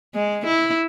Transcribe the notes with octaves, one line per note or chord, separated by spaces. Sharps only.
G#3
E4